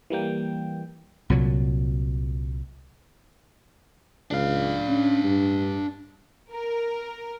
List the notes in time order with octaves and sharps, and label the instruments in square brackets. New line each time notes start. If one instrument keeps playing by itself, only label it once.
[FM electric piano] E3 G3 A#3 G5
[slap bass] C2 A#2 F#3
[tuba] C#2 [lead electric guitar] D4 F5
[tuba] C#4
G2
[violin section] A#4